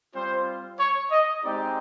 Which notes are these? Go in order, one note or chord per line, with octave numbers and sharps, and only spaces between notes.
G3 C4 F4 C5
C#5
D#5
G#3 C4 D#4 G4 D5